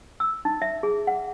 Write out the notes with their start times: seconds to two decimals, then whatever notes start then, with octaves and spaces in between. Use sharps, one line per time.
0.20 E6
0.45 D#4
0.62 E5
0.83 G#4
1.07 F#5